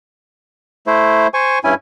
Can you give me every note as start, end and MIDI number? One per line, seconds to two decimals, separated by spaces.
0.87 1.28 57
0.87 1.28 64
0.87 1.28 72
1.34 1.59 72
1.34 1.59 80
1.34 1.59 85
1.64 1.74 43
1.64 1.74 61
1.64 1.74 64
1.64 1.74 80